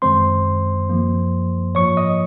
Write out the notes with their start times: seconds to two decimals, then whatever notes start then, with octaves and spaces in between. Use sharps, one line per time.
0.02 F#2 D#3 G#3 C4 C5 C6
0.90 F#2 F3 A#3
1.75 G#2 F3 A#3 C#5 C#6
1.97 D#5 D#6